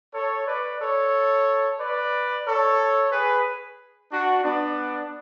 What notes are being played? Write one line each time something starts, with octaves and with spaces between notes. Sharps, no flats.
A4 C#5
B4 D5
A4 C#5
B4 D5
A4 C#5
G#4 B4
D4 F#4
B3 D4